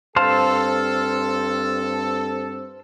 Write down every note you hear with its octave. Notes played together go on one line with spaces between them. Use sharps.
G2 C4 A4 C5 F5 A5